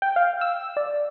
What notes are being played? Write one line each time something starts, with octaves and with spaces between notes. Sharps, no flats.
G5
F5
E6
D5